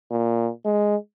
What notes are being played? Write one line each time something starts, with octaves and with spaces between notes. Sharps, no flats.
A#2
G#3